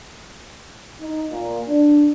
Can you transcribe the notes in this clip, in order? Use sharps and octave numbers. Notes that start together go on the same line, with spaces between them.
D#4
A#2
D4